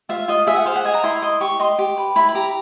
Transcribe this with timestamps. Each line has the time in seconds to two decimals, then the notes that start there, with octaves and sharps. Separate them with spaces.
0.09 F4 E5
0.28 F4 D#5
0.47 G#4 E5
0.56 F#5
0.65 C5 F5
0.76 F#5
0.84 D#5 G#5
0.94 A#5
1.04 E4 C6
1.22 D#5 C6
1.40 G4 C#6
1.60 D#5 C6
1.79 G4
1.98 B4
2.16 E4 B5
2.29 B5
2.35 G4 A#5